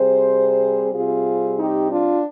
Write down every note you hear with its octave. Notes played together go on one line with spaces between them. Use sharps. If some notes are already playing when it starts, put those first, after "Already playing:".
Already playing: C3 G3 C4 G#4 C5
C3 G3 C4 F4 G#4
D#4 G4
D4 F4